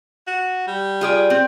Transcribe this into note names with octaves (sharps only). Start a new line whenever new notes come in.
F#4
G3
F4 G#4 D5
C4